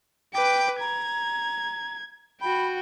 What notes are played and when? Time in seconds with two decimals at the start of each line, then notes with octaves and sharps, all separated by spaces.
0.34 B4 G5 D6
0.80 A#5 G#6
2.41 F#4 G5 B5